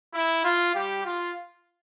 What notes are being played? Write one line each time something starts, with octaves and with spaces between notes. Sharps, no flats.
E4
F4
G3 G4
F4